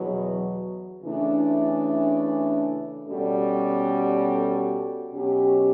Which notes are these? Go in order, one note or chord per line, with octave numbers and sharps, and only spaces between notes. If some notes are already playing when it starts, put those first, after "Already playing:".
Already playing: E2 B2 F#3
C#3 E3 A3 D4
B2 G3 C#4 F#4 A4
B2 F#3 C#4 G4